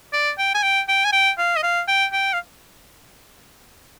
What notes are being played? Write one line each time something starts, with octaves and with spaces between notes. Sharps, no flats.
D5
G5
G#5
G5
G5
G#5
G5
F5
D#5
F5
G5
G5
F5